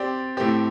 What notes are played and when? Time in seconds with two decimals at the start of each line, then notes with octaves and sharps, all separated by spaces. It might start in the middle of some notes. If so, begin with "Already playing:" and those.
Already playing: C4 G4 D5
0.37 A2 A3 C4 G4